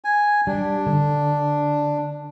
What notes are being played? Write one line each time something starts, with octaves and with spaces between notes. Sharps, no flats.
G#5
G3 D4
D3